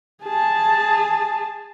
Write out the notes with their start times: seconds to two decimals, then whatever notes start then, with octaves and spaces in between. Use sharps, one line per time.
0.23 G#4 A5